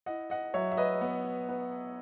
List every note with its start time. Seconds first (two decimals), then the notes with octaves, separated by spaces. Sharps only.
0.06 E4 D#5 F#5
0.30 D#5 F#5
0.54 F#3 C#5 E5
0.72 E5
0.77 B4 D#5
1.01 B3
1.49 B3